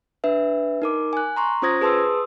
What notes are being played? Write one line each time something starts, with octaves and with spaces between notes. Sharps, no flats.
D4 B4 E5
D#4 A#4 D6
G#5 F#6
A#5 C6 C#6
C#4 F4 C5 D#6 G#6 A#6
G#4 B4 A5 C6 D#6 E6